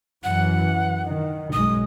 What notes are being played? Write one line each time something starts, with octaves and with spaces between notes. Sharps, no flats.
F#2 E3 F#5
D#3
B1 F#2 G#3 D#6